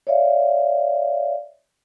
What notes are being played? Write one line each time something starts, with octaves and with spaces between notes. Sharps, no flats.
C#5 D5 E5 F5